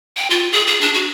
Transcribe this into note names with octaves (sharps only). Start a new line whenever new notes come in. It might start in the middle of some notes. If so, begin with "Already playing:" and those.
G5
F4
G#4
G#4
D4
F#4